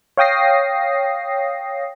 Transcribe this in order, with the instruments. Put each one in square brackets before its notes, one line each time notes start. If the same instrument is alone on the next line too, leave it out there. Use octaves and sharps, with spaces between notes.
[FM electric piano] C#5 F5 G5 D#6 A#6 C7